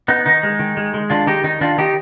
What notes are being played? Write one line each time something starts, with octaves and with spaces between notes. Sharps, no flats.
B3 D#4
D#3 D#4
G#3
D#3
G#3
G#3
D#3 D4 F4
D#3 D#4 G4
D#3 D#4
D#3 D4 F4
D#3 D#4 G4